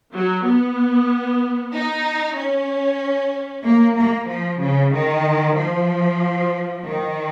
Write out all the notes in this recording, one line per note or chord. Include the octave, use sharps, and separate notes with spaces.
F#3
B3
D#4
C#4
A#3
A#3
F3
C#3
D#3
F3
D#3